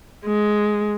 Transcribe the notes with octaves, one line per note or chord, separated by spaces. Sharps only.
G#3